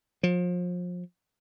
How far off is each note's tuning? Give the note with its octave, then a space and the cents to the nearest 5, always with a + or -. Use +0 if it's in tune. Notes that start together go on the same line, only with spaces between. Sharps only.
F3 +30